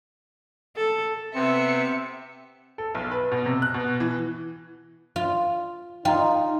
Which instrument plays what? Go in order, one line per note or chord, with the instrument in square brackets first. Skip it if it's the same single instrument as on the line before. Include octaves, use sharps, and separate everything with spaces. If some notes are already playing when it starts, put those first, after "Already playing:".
[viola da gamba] A4
[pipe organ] C3 B3 [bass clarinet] C4 [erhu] E5 [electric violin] C#7
[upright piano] A4
B1
B4
B2
C3
F#6
B2
E3
[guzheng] F4
[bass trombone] D#4 [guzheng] F4 [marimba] G5 A#5